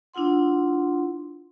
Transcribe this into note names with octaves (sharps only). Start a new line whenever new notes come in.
D4 E4 F4 F#5 C6